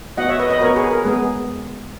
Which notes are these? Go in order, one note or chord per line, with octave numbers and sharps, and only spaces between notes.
B3 F#4 D#5 F#5
C#5 E5
B4 D#5
B4 D#5
B3 F#4 A#4 C#5
G#4 B4
A#4
G#3 B3 G#4